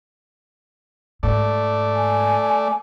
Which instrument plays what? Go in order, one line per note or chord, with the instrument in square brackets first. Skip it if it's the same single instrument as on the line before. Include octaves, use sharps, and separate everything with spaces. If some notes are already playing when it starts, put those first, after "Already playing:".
[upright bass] G#2 [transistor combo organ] A3 D5
[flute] G#5